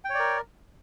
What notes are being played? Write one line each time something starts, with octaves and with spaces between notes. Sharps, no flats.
A#4 C#5 D5 G5